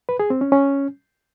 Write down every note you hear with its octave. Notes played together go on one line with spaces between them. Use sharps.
B4
G#4
C4
C#4
C#4